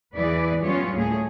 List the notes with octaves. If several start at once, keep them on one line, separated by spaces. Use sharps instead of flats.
E2 E3 G#4 B4 D5
F#3 G3 B3 C#4 F4 C#5
D2 A2 A3 A#3 G#4